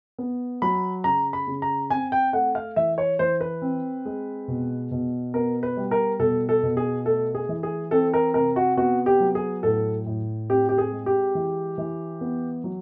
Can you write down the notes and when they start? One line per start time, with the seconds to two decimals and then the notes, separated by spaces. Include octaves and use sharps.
0.18 B3
0.62 F#3 B5
1.04 C#3 A#5
1.33 B5
1.47 C#3
1.62 A#5
1.90 C4 G#5
2.12 G5
2.33 A3 F#5
2.55 F5
2.76 E3 E5
2.98 C#5
3.19 E3 C5
3.41 B4
3.62 C4
4.05 G#3
4.48 B2
4.91 B2
5.34 B3 A#4
5.63 B4
5.77 G3
5.91 A#4
6.19 B2 A4
6.49 A4
6.63 B2
6.77 G#4
7.05 A3 A4
7.35 G#4
7.49 E3
7.63 G#4
7.91 C4 A4
8.14 A#4
8.34 C3 A#4
8.56 F#4
8.77 B3 F#4
9.06 G4
9.20 F#3
9.35 G#4
9.63 A2 A4
10.06 A2
10.50 C4 G4
10.69 G4
10.78 G#4
10.92 G#3
11.06 G4
11.35 E3
11.78 E3
12.21 B3
12.64 F#3